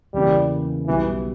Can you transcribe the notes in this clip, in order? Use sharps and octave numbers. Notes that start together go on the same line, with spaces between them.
E2 C#3 E3 G3 A#3
B1 B2 E3 G3 B3